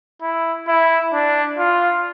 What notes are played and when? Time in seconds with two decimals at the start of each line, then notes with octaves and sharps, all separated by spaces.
0.22 E4
0.68 E4
1.13 D4
1.58 F4